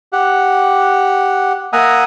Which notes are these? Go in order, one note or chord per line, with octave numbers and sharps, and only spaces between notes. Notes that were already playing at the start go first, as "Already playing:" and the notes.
G4 F#5
A#3 E5 F#5 G#5 A#5 D#6